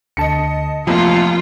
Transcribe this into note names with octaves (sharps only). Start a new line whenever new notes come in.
D2 D3 D#5 A5 C#7
A1 F2 C3 F3 A#3 F4